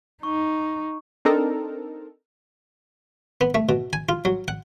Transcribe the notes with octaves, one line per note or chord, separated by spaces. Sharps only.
D#4 C#6
C4 D4 D#4 A4 A#4
B3
A3
B2
G#5
F4
F#3
F#5